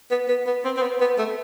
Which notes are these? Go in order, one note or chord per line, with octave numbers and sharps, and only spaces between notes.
B3
B3
B3
C4
C4
B3
B3
A3